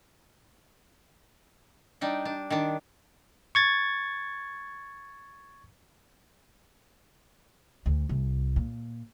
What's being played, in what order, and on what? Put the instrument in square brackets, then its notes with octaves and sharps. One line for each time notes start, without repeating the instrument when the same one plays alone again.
[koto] G3 D4 D#4 G5
D4
D#3 D4
[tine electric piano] C#6 G#6 A6
[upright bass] D2
C2
A#2